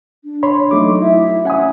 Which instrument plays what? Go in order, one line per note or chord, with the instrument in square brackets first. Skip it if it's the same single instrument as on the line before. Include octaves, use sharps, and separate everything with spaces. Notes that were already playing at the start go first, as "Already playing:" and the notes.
[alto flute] D4
[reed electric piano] C#5 B5 C6
[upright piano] F#3 A3 D#4 [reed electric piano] D6
[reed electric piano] E4 [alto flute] E5
[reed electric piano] C#4 G#5 [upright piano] F#5 D#6